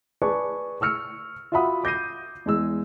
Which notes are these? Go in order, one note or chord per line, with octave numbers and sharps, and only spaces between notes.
G#4 B4 D5 A5 C#6
C#6 E6 F6 C#7
F4 F#4 E5 F#5 B5 D#6
D6 G6 A#6 C7 D#7
E2 G#3 E6